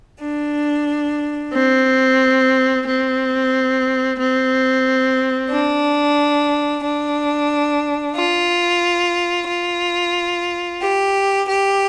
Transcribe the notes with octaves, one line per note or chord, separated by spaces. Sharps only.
D4
C4
C4
C4
D4
D4
F4
F4
G4
G4